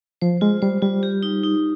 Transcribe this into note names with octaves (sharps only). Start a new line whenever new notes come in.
F3 C5
G#3 F4
G3 C5
G3 F4
G4
D#4
D#4